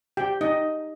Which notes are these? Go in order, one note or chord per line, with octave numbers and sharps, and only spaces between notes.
G4 G5
D#4 D#5